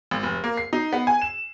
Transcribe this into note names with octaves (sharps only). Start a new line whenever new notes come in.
G#1
F1
A#3
C7
D#4
B3
G#5
E7